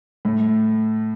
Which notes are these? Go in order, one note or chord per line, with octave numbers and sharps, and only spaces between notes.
A2